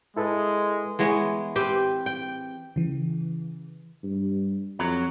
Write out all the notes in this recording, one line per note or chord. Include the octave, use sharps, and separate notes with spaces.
G#3 E4 A4 B4
E3 G#3 B3 C#5
C4 G4 B4
G5
C#3 E3
G2
F2 F#3